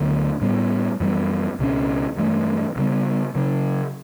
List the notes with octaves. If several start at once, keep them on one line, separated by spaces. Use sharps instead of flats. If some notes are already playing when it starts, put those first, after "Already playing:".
Already playing: D2 D3 F#3 B3
A2 G3 B3
F#2 E3 G3 B3
C#2 B2 F#3 C#4
G2 E3 A3
D2 C#3 G3 B3
C#3 F#3 C#4